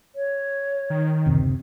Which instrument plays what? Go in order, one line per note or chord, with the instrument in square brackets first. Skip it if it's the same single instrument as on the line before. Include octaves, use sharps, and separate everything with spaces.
[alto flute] C#5
[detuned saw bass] D#3
[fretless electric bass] F#1 D2 C3